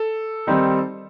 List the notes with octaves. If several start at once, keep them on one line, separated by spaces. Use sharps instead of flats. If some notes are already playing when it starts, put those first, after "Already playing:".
Already playing: A4
D#3 G3 C4 D#4